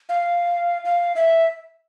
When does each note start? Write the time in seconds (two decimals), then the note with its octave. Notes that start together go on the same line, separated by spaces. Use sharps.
0.09 F5
0.85 F5
1.16 E5